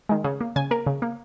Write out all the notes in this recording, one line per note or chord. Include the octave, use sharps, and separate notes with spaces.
D#3 G#3
C#3
A#3
C#3 G#5
A#3 A#4
C#3
A#3